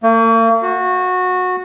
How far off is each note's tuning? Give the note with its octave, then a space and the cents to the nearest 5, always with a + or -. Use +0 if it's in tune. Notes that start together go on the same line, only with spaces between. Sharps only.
A#3 -45
F#4 -20